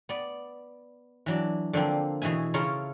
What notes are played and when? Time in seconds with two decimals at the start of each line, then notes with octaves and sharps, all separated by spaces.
0.09 B3 D5
1.26 E3 F#3 D4
1.73 D3 F3 A#3 C4
2.22 B2 E3 G#4 E5 G#5
2.54 C#3 E4 F4 C#5 A5 A#5